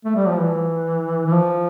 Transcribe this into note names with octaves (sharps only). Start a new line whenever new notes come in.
A3
G3
F3
E3
E3
F3